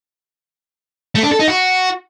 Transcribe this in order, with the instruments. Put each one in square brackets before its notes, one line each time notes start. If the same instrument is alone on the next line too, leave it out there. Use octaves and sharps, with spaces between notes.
[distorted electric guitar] A3
D4
A4
D#4
F#4